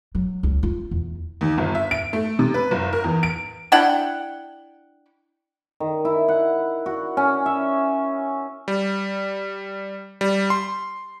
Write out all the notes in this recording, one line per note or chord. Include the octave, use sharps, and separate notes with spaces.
F#3
C#2
F4
E2
D#2
G1
E5
D7
A3
C3
B4
F#1
A#4
E2
D7
D4 E4 F#5 G5
D#3
E4
F#5
F#4
C#4
E5
G3
G3
C6